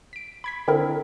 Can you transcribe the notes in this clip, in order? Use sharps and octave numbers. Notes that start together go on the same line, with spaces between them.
B6 D7
B5 G#6 B6
D3 C4 E4 A#4